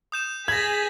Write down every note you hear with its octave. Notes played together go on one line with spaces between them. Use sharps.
D#6 G6 E7
G#4 G#6 A#6 B6 F#7